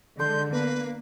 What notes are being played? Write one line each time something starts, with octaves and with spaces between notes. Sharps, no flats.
D3 G#3 A4 C6 G6
A#3 B3 B4